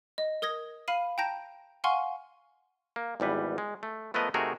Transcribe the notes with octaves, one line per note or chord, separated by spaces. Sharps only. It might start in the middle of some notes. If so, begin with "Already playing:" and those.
D#5
A#4 D#6 G#6 A#6
F5 B5 F6 C7 D#7
G5 A5 A#5 G6 A#6 D7
F5 F#5 G#5 C6 C#6 F6
A#3
G#1 E2 G3 B4
G#3
A3
F3 A3 B3 A#4 B4 D#5
C3 A3 D#4 F#4 G#4 A#4